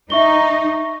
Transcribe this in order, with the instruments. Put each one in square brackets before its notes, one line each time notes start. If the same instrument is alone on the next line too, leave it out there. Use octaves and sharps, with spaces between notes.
[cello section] D#4 [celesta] E5 C#6 G7